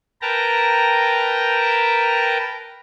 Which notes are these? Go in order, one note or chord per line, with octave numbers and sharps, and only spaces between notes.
A#4 B4 G5 A5 A#5